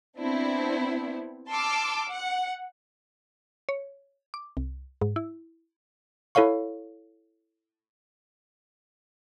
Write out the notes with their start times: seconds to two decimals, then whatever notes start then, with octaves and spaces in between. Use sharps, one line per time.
0.18 B3 C4 D4 E4
1.49 A5 C6 D6 E6 F6
2.10 F#5
3.69 C#5
4.34 D6
4.57 C2
5.01 G#2
5.16 E4
6.35 E4 A4 C#5 F5 C#6